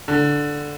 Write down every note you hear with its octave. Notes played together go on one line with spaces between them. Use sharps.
D3